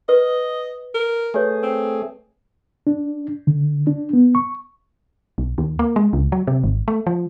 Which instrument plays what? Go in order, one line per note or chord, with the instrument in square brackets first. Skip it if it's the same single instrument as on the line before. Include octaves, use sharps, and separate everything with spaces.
[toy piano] B4 [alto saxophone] D#5
[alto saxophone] A#4
[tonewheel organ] A3 G#4 [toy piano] G4 B4 C#5
[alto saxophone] C4
[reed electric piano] D4
D3
D4
B3
C#6
[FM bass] B1
D#2
A#3
G#3
C#2
F#3
C3
G#1
A3
F3